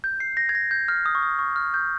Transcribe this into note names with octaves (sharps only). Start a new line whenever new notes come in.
G6
C7
A#6
G#6
A#6
G6
F6
D#6
C#6
D#6
C#6
F6
G6